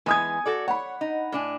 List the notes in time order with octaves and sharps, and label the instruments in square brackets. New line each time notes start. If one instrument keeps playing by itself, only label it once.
[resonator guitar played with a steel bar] E3 G#3 B3 [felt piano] G#5 D#6 G#6
[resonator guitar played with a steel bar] F#4 A4 D5
[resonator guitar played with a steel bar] C#5 [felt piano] F#5 B5
[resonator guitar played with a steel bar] D#4
A2 D4 G#5